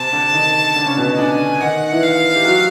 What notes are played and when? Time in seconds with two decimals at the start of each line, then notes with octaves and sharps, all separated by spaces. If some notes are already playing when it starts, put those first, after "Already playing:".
Already playing: C3 C4 A5
0.13 D3 D4
0.33 D#3 D#4
0.76 D3 D4
0.86 C#3 C#4
0.97 B2 B3
1.08 D#4
1.18 D3 D4 G#5
1.60 D#3 D#4 F#5
1.92 E3 E4
2.03 F5
2.36 G4
2.45 F#3 F#4